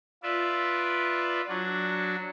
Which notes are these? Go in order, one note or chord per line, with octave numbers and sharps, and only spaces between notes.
F4 B4 D5 E5
F#3 D4 F#4